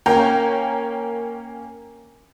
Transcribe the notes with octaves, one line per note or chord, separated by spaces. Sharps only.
A#3 C#4 C#5 G5 A#5